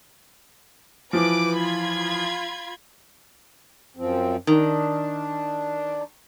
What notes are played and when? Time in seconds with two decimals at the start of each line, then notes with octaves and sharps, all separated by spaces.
1.13 E3 F3 B4 D6
1.57 F4 B5 G#6
3.97 F#2 F3 C4
4.47 D#3 D4